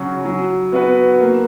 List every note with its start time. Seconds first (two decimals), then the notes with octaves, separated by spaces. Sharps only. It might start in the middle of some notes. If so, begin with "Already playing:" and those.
Already playing: C#3 F#3 C#4 F#4
0.25 F#3
0.72 B3 F#4 B4
1.20 A#3